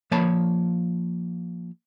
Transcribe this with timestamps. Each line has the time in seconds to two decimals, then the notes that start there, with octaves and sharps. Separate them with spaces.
0.11 F3 A#3 C#5 A5 B5